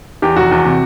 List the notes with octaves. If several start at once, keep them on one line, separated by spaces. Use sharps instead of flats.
E2 G4
F1 F#4
E2
C3